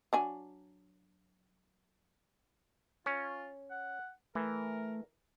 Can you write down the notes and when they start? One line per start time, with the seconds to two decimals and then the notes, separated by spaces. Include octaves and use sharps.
0.13 F#3 D4 G#5
3.06 C#4 F4
3.71 F#5
4.35 E3 A3 A#4